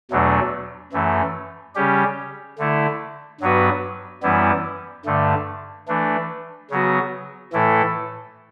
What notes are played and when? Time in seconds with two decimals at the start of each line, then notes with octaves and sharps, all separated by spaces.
0.11 E2 B2 F#3 A3 D4
0.93 F#2 E3 A3
1.75 C#3 G3 C#4 G4
2.58 D3 A3 E4
3.41 G2 F#3 B3 F#4 B4
4.23 F#2 E3 G3 B3 E4
5.06 G2 D3 A3
5.88 E3 A3 D4
6.71 C#3 F#3 B3 F#4
7.53 A2 E3 A3 E4 A4